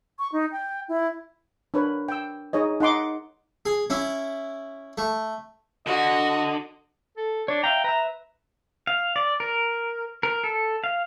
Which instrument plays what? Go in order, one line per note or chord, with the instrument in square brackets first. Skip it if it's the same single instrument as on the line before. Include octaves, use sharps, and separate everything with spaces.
[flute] C#6
D#4
G5
E4
[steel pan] D4 A#4 B4 C#5
G5 E6
D#4 G#4 C#5 D#5
D#4 F#5 C6 D6
[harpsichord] G#4
C#4 E4
A3
[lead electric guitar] D3 [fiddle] F#4 [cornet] D#5
[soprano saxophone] A4
[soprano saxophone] D4 [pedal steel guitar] C#5
[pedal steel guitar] E5 F5 A#5 [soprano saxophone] G5
[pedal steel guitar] B4 E5 [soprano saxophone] A#5
[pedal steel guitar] F5
D5
A#4
A#4
A4
F5